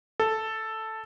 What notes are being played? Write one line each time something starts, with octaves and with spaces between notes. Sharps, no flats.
A4